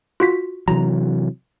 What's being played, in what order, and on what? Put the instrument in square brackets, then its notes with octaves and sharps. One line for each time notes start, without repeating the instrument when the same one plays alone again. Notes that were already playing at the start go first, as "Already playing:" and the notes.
[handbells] F4 F#4 B6
[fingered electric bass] C3 E3 F#3 [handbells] A#5